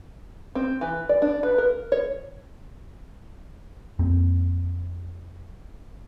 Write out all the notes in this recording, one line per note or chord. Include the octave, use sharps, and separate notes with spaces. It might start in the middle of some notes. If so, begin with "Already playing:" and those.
C4
E3
D5
D4
B4
A#4
C#5
F2 A#3 C4